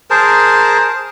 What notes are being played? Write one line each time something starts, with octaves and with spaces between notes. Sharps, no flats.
G#4 A#4 C5 A5